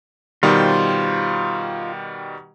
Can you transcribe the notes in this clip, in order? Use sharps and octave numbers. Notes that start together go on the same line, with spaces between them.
B2 D#3 G3 F4 C5